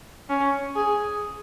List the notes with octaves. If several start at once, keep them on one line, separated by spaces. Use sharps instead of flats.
C#4
G#4